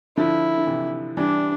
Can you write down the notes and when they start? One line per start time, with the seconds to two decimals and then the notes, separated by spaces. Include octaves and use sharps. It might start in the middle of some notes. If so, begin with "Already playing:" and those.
0.17 D3 F3 E4
0.57 D3
0.67 C3 E3
1.17 E3 G3 D4